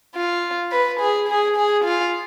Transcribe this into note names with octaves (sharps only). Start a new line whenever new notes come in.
F4
B4
G#4
G#4
G#4
F4